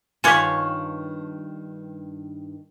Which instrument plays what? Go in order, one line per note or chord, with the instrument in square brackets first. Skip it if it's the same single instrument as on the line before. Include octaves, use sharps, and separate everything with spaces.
[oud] G2 D#3 [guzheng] F4 C#5 F#5 [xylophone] G#5 D6 B6